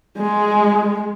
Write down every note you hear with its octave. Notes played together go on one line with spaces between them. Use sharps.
G#3